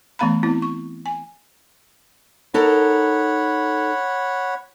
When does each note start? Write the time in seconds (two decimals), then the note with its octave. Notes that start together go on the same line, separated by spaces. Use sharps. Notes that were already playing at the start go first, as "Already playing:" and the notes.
0.19 E3 A3 B3 F5 A#5 B5
0.43 B3 C4 E4
0.62 C#6
1.06 G#5
2.54 D#4 A4 A#4 C#5 F#5 B5